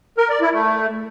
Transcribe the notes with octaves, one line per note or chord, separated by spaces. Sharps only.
A#4
D5
E4
A3